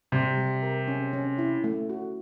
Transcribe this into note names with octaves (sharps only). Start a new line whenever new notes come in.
C3 G3
G3
A#4
C#4
C#4
E4
A3
F#4